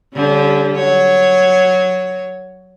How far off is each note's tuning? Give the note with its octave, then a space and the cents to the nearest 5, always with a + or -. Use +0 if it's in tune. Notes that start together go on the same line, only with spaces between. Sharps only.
D3 -30 G3 +0 C#4 +0
F#3 +0 C#5 +0